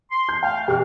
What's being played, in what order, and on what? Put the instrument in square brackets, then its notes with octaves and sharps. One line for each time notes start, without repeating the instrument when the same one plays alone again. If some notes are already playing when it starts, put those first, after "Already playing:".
[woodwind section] C6
[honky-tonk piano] G6
[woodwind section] A3 F5 [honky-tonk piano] G5
[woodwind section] B2 E3 [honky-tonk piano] G4 F6